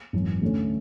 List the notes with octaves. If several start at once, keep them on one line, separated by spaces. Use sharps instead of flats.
G#1 F#2 E3
D2 D3 A3 C#4